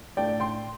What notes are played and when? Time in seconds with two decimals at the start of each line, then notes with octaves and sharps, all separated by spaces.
0.17 A2 A3 D4 F4 D5 G5
0.40 G5 C6